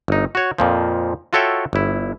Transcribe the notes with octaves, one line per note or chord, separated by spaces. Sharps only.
G1 D#4
F#4 C#5
F2 A#2 F3
F4 F#4 A4 C#5 E5 G5
G1 E4